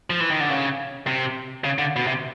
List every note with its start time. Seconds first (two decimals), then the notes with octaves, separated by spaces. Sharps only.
0.10 F3
0.20 E3
0.30 D#3
0.40 D3
0.50 C#3
1.07 C3
1.64 C#3
1.79 D3
1.96 B2
2.07 C3